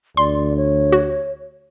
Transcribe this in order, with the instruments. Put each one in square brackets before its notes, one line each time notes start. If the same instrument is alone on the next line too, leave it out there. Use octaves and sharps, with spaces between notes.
[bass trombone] D2 [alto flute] D5 [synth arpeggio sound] C6
[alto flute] C#5
[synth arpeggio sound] F#4